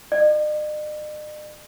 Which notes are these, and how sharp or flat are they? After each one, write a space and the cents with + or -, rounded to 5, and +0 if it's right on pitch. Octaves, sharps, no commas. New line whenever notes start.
D#5 -45